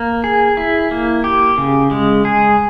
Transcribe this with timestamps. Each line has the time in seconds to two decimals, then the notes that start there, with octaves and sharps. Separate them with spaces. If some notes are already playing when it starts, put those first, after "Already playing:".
Already playing: A#3
0.24 G#4
0.57 E4
0.91 A#3
1.24 G4
1.58 C#3
1.91 G#3
2.25 G#4